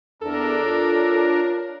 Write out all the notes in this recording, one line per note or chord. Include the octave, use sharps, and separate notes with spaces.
E2 D4 A4 A#4
F4 C#5